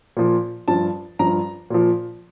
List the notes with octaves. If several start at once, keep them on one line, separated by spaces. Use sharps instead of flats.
A#2 F3
G2 F3 A5
G2 F3 A#5
A#2 F3